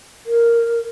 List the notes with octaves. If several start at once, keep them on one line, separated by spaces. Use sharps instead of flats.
A#4